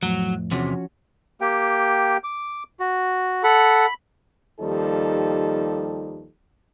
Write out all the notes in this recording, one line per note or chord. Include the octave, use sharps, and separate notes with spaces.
F2 A2 F#3
E2 C3 F3 C#4 F#4
A#3 G4 G5
D6
F#4
A4 F#5 B5
D#2 F3 G3 D#4 G4 A4